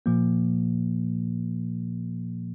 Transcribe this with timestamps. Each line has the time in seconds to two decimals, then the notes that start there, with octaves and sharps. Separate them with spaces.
0.06 A#2 F3 A#3